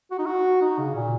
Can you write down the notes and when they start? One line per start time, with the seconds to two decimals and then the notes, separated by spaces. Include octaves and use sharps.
0.11 F#4
0.19 D#4
0.26 F#4
0.61 D#4
0.78 C#3
0.95 A#2